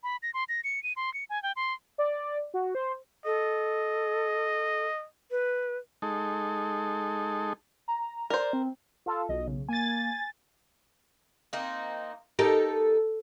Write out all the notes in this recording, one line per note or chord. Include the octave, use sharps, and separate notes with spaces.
B5
A#6
C6
A#6
C#7
D#7
C6
C#7
G#5
G5
C6
D5
F#4
C5
A4 D#5
B4
G#3 D#4 A4
A#5
A#4 C5 D5
C4
F4 A4
B1 D#5
C#3
A#3 G#5 A6
A#3 C4 D#4
D#4 G4 A4 A#4